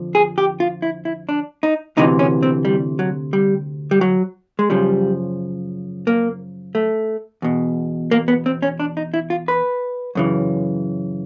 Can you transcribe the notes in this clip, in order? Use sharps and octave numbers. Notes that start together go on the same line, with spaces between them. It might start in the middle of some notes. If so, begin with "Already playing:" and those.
Already playing: F2 D3 F3
G#4
G4
F4
E4
E4
D4
D#4
D2 C3 E3 D#4
C#4
C4
G3
F#3
G3
G3
F#3
G#3
F#2 C#3 F3 G3
A#3
A3
E2 B2
A#3
B3
C4
C#4
D4
D#4
E4
F4
B4
F#2 C#3 E3